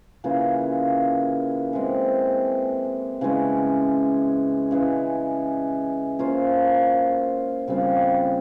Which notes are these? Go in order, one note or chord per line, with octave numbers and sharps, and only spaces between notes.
C#3 E3 A#3 F4
E3 G#3 C4
C#3 E3 G#3 C#4
C#3 E3 G#3
A#3 C#4 F4 C5
C#3 G3 C4 F4